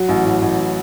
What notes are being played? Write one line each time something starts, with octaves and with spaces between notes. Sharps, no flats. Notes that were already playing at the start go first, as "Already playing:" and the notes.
Already playing: F#3
A1
A2
A1